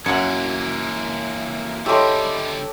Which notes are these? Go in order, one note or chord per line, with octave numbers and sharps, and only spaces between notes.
F#2 B2 E3 A#3 F#5 G#6 C#7
D3 G3 G#3 E4 G4 A4 C#5